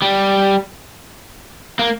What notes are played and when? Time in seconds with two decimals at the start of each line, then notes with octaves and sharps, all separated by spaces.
0.02 G3
1.79 A#3